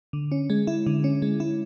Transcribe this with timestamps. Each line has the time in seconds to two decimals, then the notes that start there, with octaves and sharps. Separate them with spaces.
0.13 D3
0.32 C#4
0.50 G#3
0.67 E4
0.87 D3
1.04 C#4
1.22 G#3
1.40 E4